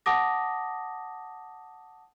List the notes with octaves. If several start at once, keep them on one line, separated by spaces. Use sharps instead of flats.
F#5 A5 D6 D#6 A#6